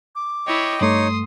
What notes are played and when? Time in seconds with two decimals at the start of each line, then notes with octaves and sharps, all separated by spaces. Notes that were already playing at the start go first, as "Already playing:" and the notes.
0.15 D6
0.47 E4 C#5 D#5 G5
0.81 G2 A3 D#4 C#5 C6 D#6